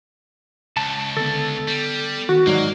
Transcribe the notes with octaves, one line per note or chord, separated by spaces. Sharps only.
C#2 A5
D3 B3 A4
G3
D#3 F#4
G#2 F#3 A#3 D#4 D5